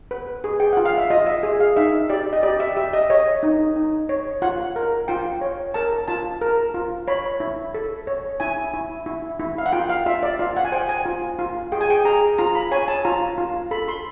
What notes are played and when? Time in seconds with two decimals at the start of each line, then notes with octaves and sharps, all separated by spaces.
0.11 B4
0.44 G#4
0.60 G5
0.73 F4 F#5
0.85 F5
0.98 E5
1.10 F4 D#5
1.26 E5
1.43 G#4
1.60 F5
1.76 D#4 E5
2.10 G4 D5
2.33 D#5
2.43 G4 D5
2.60 E5
2.77 G4 E5
2.93 D#5
3.10 C#5 D#5
3.43 D#4
3.76 D#4
4.09 C#5
4.42 F4 F#5
4.76 A#4
5.08 F4 G5
5.41 C#5
5.74 A#4 A5
6.08 F4 A5
6.41 A#4
6.74 F4
7.08 C#5 B5
7.40 E4
7.74 A4
8.07 C#5
8.40 E4 G#5
8.74 E4
9.06 E4
9.40 E4
9.58 F5
9.66 F#5
9.72 F4 G5
9.89 F5
10.06 F4 E5
10.23 D5
10.39 F4 F5
10.57 F#5
10.65 G#5
10.72 C5 G5
10.89 G#5
11.06 F4
11.39 F4
11.72 G#4 G5
11.81 G#5
11.90 G5
12.05 G#4 A#5
12.38 F4 A#5
12.55 B5
12.71 C#5 G#5
12.88 A5
13.05 F4 A#5
13.38 F4
13.71 A4 B5
13.88 C6